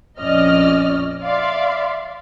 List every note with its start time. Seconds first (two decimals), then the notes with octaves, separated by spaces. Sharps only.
0.18 A#1 F2 C#4 D5 D#5 F6
1.23 D5 E5 F5 C6